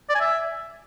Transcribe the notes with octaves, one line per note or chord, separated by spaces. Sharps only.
D5
G#5
E5